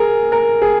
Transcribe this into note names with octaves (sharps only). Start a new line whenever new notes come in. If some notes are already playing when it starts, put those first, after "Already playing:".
Already playing: G#4 A#4
A#4
G#4